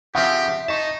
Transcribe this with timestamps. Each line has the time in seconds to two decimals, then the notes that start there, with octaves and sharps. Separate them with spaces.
0.15 C#3 F3 C4 G4 E5 F#5
0.68 D#4 D#5 A5 C#6